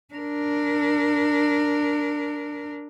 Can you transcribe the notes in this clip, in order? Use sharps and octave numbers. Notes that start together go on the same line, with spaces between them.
D4 A#4